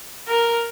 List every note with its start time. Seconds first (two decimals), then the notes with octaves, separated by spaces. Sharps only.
0.28 A#4